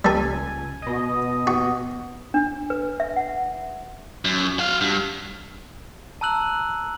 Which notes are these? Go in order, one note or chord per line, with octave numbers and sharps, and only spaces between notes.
C#2 G3 A4 G#5
B2 D#5
F#4
D4
B4
E5
F#5
F#2
F#4 F5
G2
A5 A#5 E6 F#6 F#7